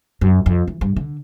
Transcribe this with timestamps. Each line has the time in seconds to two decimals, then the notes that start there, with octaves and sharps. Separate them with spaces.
0.21 F#2
0.46 F2
0.68 E3
0.81 G2
0.96 D3